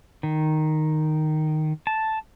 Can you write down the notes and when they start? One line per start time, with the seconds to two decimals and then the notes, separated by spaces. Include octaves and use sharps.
0.23 D#3
1.87 A5